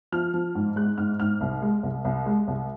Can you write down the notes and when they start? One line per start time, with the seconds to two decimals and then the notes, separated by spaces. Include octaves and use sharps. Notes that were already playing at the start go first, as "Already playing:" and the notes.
0.12 F3 F6
0.34 F3
0.55 G#2
0.76 G#3 F#6
0.98 G#2 F6
1.20 G#2 F6
1.41 C2
1.62 G#3
1.83 C2
2.05 C2
2.26 G#3
2.48 C2